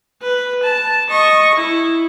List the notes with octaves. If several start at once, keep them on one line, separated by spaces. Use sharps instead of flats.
B4
A5
D#5 C#6
E4